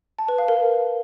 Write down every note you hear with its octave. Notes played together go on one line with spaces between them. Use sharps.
A5
B4
F5
A#4